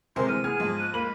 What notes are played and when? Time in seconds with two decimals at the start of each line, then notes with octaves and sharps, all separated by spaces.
0.16 C3 G#3 A#4 C5 G#5 C6
0.28 E3 F6 D#7
0.44 B3 G#4 G#5 F6 G#6
0.60 G#2 F3
0.79 F#6
0.93 A#3 B5 F#7